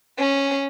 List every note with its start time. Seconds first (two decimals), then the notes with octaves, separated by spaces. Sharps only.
0.19 C#4